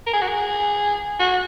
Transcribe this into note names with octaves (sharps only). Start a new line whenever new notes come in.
A#4
G#4
F#4
G#4
F#4